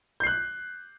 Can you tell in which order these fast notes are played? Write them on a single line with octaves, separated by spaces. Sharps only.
G6 C7 F#6